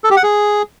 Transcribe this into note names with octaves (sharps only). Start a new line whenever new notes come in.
A4
G4
F#5
G#4